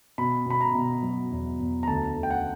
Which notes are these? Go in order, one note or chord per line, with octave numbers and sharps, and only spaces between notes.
B2 B5
B2 B5
A#5
B2
F#3
E2
E2
A#5
D2 A5
A3
G5
F#5